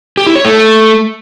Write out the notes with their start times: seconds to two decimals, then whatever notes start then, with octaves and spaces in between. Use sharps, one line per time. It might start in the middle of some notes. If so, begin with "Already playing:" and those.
0.17 G4
0.27 E4
0.36 C#5
0.45 A3